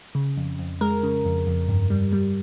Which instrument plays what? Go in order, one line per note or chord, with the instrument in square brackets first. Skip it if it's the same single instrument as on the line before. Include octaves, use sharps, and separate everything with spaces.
[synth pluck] C#3
F2
F2
G#3 A#4
C#3
F2
F2
G2
G3
G3